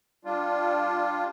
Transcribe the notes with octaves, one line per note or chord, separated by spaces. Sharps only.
G3 D4 F4